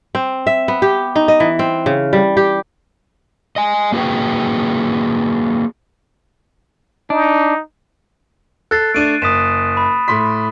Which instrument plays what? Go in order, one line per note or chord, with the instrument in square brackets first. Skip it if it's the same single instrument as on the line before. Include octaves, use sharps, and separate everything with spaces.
[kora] C4
E5
B3
G4
D#4
D#5
E3
C4
C#3
G3
G4
[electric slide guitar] D#5 G#5
A#3 F#4 G#4 B4 G5
[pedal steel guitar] D4 [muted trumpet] D#4
[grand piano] A4 [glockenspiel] F#6 A6 C7
[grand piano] A3 D4 [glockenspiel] D7 D#7
[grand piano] F#1 [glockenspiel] D#6 B6 E7
[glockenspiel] B5
[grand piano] A2 C6 B6